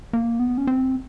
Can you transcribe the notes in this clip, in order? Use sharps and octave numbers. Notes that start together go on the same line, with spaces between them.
A#3
B3
C#4
C4